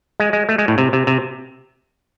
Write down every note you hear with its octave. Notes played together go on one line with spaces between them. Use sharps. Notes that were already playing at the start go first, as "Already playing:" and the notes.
G#3
G#3
A3
G#3
A2
C3
C3
C3